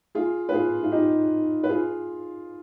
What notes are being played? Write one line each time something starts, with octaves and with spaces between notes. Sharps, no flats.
F4 G#4
B4
F4 G#4
F4
D#4 G4
B4
F4 G#4